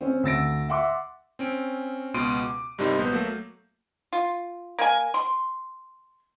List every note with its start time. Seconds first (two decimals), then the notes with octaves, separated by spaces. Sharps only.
0.01 C4 C#4
0.23 D2 E6 A6 A#6 D7
0.69 E5 F#5 C6 D6
1.39 C4 C#4 D7
2.14 C#2 B2 B3 C6 D7 D#7
2.44 D6
2.78 G2 C3 G3 D#4 A#4 C6
2.98 A#1 B3 G6
3.13 F#3 A3 A#3
4.13 F4
4.79 A#3 G#5
5.14 C6